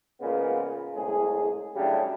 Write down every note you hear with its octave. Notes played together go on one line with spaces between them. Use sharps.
A#2 C#3 F3 G#3 B3
C2 A2 G#3 C#4 G#4
A2 C#3 F#3 G3 D4 G4